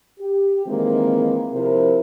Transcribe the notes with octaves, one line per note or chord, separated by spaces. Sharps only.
G4
D#3 E3 G#3 A#3 C4
C3 F3 E4 A#4